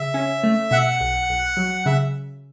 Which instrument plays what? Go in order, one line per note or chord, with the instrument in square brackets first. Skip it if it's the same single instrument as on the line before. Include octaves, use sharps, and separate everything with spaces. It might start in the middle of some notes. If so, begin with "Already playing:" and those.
Already playing: [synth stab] C#3 [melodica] E5
[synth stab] C#4
A3
[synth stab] B2 [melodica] F#5
[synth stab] B1
B1
F#3
[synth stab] C#3 [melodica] E5